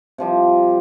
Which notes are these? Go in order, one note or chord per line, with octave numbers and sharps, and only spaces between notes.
C3 F3 G3